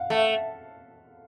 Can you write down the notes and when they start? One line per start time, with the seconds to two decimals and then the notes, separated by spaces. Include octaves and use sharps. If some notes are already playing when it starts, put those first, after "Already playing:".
Already playing: F5 F#5
0.10 A3 F#5